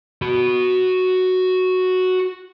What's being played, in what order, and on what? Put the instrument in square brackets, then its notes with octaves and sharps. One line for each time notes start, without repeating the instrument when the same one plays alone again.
[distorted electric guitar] F#4 B5